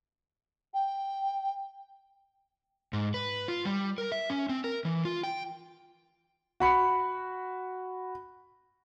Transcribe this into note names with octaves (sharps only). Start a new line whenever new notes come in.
G5
G#2
B4
F4
G3
A#4
E5
C#4
C4
A#4
E3
F4
G5
F#4 B5 C#7